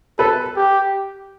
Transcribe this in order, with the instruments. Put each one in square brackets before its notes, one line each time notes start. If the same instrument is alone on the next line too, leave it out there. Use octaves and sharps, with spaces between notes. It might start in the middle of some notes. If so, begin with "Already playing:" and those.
[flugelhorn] A4 [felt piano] B4
[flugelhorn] G4